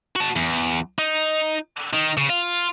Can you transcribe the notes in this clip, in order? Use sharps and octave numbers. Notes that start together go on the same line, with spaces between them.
F#4 A5
E2
D#4
D#3
C#3
F4